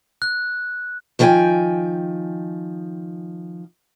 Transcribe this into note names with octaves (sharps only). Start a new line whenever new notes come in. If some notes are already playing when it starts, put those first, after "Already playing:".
F#6
D#3 F3 B4 C5 G5 G#5